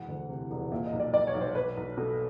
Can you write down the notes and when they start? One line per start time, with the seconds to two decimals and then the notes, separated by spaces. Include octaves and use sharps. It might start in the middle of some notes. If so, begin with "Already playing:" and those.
Already playing: E1 E3 F#5
0.08 D2
0.29 C3
0.51 E1
0.72 A#2 E5
0.85 D#5
0.93 B1
1.00 D5
1.13 B1 D5
1.27 C#5
1.34 B1
1.41 C5
1.55 B1 B4
1.77 B1
1.97 B2 A4